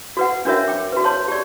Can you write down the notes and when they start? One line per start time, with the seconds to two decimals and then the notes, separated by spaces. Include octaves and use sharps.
0.17 F#4 B4 F#5
0.45 C#4 D4 F#4 A#4 C#5 E5
0.68 G5 D6
0.92 F#4 B4
1.04 C#5 A5 C6
1.28 G4 D5